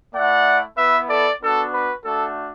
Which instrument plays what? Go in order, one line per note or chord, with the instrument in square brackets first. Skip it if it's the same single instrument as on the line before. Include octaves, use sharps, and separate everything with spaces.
[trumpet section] A3 E4 D5 F#5
B3 E4 B4 E5
A4 D5
B3 D4 F#4 A4
B4
A3 D4 F#4 A4